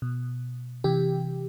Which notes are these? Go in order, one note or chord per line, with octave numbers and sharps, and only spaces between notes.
B2
C3 E3 G4